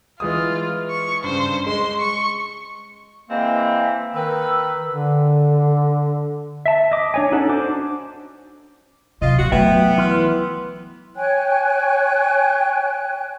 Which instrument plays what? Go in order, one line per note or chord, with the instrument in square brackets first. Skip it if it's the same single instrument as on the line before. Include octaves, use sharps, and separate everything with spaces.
[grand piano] E3 G#3 D#6 [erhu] F4
[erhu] C#6
[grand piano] G2 C#3 [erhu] C5
[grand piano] G#3 [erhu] C6
[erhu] C#6
[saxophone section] E3 G#3 C4 [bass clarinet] A#3
[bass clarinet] D#3 [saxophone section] B4 [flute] E6
[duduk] D3
[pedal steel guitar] E5 A5
D#5 D6
D4 C#5 G#5
C#4 D#4 F#4 A4 A5
D4 C5 D6
[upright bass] C3 F#3 [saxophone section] F4 D#5
[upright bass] B2 D3 [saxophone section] F#4
[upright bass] F#3 A3 [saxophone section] B3 [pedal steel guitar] E5 G5
[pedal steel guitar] E3 C6 F6
[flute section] C#5 G5 G#5 F#6